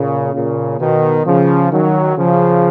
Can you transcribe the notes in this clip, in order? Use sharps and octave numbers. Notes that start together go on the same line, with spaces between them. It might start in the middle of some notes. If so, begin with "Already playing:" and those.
Already playing: A#2 C#3
A#2 C#3
B2 D#3
C#3 F3
D#3 F#3
C#3 F3